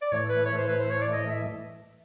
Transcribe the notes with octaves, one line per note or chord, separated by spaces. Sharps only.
D5
A2 E3 A3 C#5
B4
C#5
C5
B4
C5
C#5
D5
D#5
E5